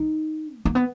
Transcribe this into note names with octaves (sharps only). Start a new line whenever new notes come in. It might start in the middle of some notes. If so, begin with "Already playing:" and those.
Already playing: D#4
G#3
A#3
B3